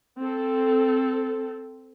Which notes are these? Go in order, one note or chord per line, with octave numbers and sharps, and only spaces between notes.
C4 A4